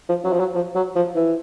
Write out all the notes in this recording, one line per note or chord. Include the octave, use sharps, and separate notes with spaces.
F3
F#3
F3
F#3
F3
F#3
F3
E3